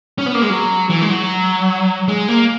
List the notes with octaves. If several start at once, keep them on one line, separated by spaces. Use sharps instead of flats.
C#4
B3
A#3
G#3
F#3
E3
G#3
F#3
G#3
A#3